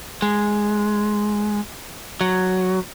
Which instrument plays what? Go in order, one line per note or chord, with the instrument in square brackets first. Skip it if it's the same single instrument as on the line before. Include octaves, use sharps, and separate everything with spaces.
[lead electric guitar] G#3
F#3